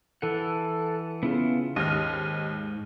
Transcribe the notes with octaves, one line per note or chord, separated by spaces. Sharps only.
E3 A4 F#5
C#3 B3 E4 F4
D#2 G#2 D#5 F6